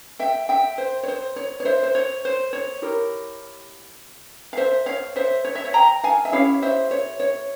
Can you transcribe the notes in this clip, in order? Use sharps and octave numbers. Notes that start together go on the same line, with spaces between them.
E5 G5
E5 G5
C5
C#5
C5
C#5
C#5
C5 E5
C5
C#5
C5
C#5
E4 G4 A#4
F5
C5 E5
C#5 F5
C5 E5
C#5
E5
C#5
G5 A#5
F5 G#5
E5
C#4 E4 G4 C#5 F5
C5 E5
C#5
C#5